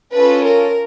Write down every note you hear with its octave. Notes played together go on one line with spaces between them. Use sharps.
C#4 F4 A4 B4
A#4